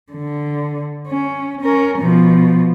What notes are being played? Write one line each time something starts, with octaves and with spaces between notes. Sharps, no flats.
D3
C#4
C#4 A#4
B2 F3